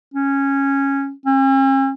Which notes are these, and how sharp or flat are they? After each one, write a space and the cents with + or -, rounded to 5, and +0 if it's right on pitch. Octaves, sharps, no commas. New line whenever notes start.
C#4 -10
C#4 -45